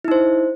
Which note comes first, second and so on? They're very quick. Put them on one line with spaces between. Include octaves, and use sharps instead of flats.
E4 D#4 C5